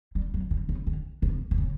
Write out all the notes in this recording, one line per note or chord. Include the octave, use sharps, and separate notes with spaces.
G3
F#3
C#3
C#3
D3
B2
C3
C#3